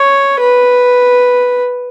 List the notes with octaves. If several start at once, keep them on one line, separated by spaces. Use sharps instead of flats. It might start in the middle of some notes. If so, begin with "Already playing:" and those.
Already playing: C#5
B4